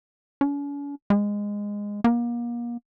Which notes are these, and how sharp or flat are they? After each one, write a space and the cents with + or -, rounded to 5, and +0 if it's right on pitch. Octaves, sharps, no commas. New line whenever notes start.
C#4 +45
G#3 -15
A#3 +35